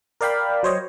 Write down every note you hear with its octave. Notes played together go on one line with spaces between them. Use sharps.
A#4 D5 F5 G5 B5
F#3 C5 C#5 D#5